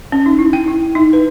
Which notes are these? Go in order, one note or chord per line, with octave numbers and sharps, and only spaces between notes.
C#4
D#4
E4
G5
E4
D#4
B4